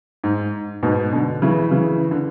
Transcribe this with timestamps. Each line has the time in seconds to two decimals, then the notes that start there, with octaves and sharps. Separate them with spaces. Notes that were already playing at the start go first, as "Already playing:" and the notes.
0.24 G#2
0.83 G#2 B2
1.13 B2 D3
1.42 C#3 E3
1.71 C#3 E3
2.11 D3